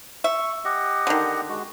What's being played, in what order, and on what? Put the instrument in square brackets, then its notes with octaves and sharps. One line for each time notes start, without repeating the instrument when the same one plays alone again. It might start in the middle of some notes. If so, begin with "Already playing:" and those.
[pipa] E5 [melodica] C#6
[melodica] G4 D#5 F#5
[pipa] D3 D#3
[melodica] G#3 F#4